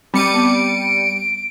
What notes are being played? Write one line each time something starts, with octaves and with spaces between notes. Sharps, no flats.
G3 C4 D6 C#7 D#7
B3
D7